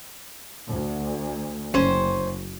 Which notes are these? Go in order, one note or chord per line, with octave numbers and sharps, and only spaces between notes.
D2
F#1 C#4 C5